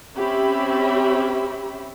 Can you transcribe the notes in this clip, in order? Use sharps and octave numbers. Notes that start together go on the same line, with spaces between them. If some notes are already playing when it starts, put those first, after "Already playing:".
C4 C#4 G4 E5 B5